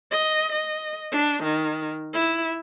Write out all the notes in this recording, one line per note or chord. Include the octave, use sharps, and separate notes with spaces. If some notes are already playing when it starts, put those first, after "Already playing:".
D#5
D#5
D4
D#3
E4